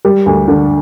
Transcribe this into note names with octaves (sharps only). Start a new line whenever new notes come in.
G3
D2
D3